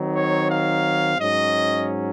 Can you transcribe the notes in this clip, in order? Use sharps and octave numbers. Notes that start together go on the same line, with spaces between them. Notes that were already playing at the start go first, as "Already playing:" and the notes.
Already playing: D#3 F#3 C4 D#4
C#5
F5
G#2 F#3 C#4 D#5